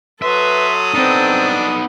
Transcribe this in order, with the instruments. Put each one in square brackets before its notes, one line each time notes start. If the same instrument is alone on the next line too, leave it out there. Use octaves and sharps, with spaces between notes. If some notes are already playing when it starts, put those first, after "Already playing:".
[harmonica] F#3 C6 [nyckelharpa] A4 D#6 [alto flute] B4 [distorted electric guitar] E5
[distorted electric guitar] B3 D#4 [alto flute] C4 [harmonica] D4